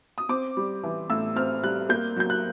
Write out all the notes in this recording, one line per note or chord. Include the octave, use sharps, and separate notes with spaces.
D#6
C4 D6
G3
E3
A2 E6
C4 F6
G3 F#6
A#3 G6
F#3 G6
F#6